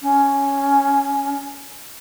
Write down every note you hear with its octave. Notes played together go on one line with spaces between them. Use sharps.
C#4